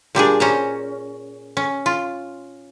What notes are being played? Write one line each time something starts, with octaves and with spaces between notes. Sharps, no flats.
A#2 G3 D4 G#4
C#4 C5 A#5
C#4
F4